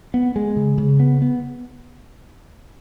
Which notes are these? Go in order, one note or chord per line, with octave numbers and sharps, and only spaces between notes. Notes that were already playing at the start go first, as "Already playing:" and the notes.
B3
G#3
C#3
C#3
B3
B3